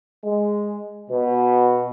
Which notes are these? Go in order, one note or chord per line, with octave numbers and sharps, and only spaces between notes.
G#3
B2